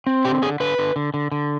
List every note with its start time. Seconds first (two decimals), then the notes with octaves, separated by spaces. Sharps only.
0.07 C4
0.25 D3 G4
0.42 D3 G#4
0.60 D3 B4
0.78 D3
0.96 D3
1.14 D3
1.32 D3